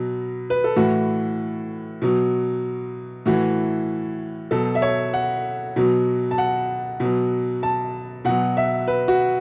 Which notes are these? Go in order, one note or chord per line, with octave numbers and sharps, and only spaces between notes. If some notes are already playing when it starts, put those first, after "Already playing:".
Already playing: B2 F#3
B4
A4
A2 E3 F#4
B2 F#3
A2 E3 F#4
B2 F#3 A4
E5
C#5
F#5
B2 F#3
A5
F#5
B2 F#3
A5
B2 F#3 F#5
E5
B4
F#4